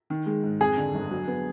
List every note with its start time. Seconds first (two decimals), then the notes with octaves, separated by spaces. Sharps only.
0.10 D#3
0.26 G#3
0.43 G#2
0.61 F2 G#4
0.77 D3
0.95 G1
1.11 F#3
1.28 B3